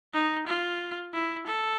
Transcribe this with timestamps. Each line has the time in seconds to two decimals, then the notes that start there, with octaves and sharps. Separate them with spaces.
0.14 D#4
0.47 F4
1.13 E4
1.47 A4